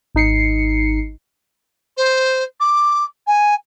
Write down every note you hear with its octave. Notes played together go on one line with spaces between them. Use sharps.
G#1 D#4 C7 C#7
C5
D6
G#5